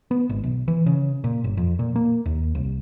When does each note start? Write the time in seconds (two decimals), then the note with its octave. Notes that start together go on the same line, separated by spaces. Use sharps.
0.11 B3
0.29 G#1
0.44 B1
0.68 E3
0.86 C#3
1.24 A#2
1.44 G1
1.57 F2
1.79 A#2
1.96 A#3
2.26 D#2
2.55 C2